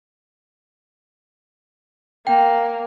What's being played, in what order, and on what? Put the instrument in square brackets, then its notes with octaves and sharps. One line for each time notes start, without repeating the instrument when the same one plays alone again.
[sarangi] A#3 [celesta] G5